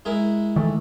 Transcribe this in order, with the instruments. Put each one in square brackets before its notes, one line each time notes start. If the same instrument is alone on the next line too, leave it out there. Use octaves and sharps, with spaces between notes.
[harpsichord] G#3 E4 A#4
[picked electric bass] D#3 E3 A3